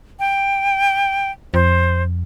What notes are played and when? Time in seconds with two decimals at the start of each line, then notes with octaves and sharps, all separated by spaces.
0.20 G5
1.54 F2 C5